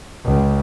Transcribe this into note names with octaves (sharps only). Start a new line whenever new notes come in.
C#2